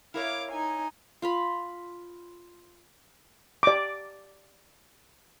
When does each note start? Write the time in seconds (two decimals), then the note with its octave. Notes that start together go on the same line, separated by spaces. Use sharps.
0.14 E4 A#4 C#5 F5 D6
0.52 D#4 G#5
1.22 F4 F5 B5
3.63 D5 D6